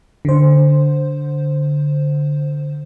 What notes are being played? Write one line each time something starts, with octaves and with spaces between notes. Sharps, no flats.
D3 C5